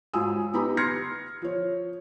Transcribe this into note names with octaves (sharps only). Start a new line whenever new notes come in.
G#2 F#3 F4 G#5 D#6 E6
B3 D#4 G4 A#5 B5
C6 F6 G#6 A#6 C7 C#7
F3 C#5